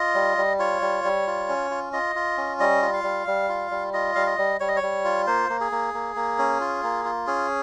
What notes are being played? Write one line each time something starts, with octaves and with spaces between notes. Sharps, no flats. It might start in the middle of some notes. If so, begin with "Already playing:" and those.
Already playing: F4 D#5
G3
G3
F4 C#5
G3
G3
F4
C#4
F4
F4 D#5
F4
C#4
G3 D#5
F4
F5
G3
G3
F4
G3
F4 D#5
G3 F5
D#5
G3
G3 C#5
D#5
C#5
G3
F4
A#3 C5
A#3
G#4
A#3
A#3
A#3
C#4
F4
A#3
F4
C#4 G#4